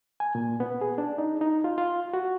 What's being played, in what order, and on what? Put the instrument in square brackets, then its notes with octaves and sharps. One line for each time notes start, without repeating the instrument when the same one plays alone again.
[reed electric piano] G#5
A#2
B3
G#4
D4
D#4
D#4
F4
F4
F#4